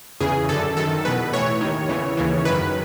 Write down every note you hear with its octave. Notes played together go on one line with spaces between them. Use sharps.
E2 C#3 E3 G#4
F#2 D3 A4
F#2 D#3 A4
E2 B2 B4
A2 E3 C#5
D#2 D#3
E2 C#3 E3
D#2 C#3 E3
F#2 D#3 B4